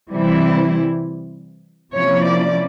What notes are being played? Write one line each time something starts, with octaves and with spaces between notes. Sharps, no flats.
C3 E3 G3 C4 E4
C3 F3 A#3 C#4 E4 C#5
D5